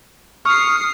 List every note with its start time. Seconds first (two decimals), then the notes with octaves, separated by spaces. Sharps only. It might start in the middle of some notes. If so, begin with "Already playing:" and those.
0.45 C#6 D#6 F6 C7